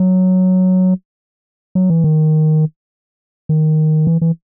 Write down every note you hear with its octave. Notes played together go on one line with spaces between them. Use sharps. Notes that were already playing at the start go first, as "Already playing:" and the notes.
Already playing: F#3
F#3
E3
D#3
D#3
E3
E3